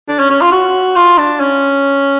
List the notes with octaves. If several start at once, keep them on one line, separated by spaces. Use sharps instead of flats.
D4
C#4
C#4
F4
F#4
F4
D4
C#4